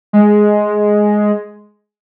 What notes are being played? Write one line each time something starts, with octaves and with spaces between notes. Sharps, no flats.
G#3